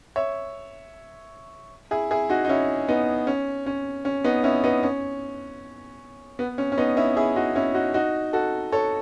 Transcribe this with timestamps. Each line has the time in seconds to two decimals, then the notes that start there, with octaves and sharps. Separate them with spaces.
0.16 C#5 E5
1.91 E4 G#4
2.11 E4 G#4
2.30 D#4 F#4
2.45 D#4
2.49 C#4 E4
2.88 B3 D#4
3.27 C#4
3.66 C#4
4.05 C#4
4.24 B3 D#4
4.44 C#4 E4
4.64 B3 D#4
4.83 C#4
6.39 B3
6.58 C#4
6.72 C#4
6.77 B3 D#4
6.97 C#4 E4
7.17 E4 G#4
7.36 D#4 F#4
7.55 C#4 E4
7.74 D#4 F#4
7.94 D#4 F#4
8.33 F#4 A4
8.72 A4 C#5